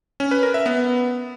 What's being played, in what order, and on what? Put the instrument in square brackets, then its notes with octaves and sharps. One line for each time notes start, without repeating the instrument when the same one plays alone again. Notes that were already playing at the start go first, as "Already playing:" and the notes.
[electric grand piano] C#4
B4
A#4
E5
B3